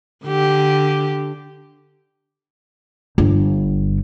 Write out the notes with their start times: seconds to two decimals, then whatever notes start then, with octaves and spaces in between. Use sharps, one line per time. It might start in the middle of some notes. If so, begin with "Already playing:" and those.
0.25 D3 G4
3.18 G1